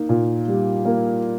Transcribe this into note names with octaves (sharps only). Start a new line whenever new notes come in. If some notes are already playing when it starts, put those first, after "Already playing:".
Already playing: A#3 D#4
A#2
G3
A#3